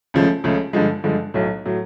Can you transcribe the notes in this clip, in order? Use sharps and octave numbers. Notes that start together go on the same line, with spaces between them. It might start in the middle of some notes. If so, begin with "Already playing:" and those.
C#2 C#3 F3 A3
C#2 C#3 F3 A3
G2 D3 F3 G#3
G2 D3 F3 G#3
B1 A2 F#3
A2 F#3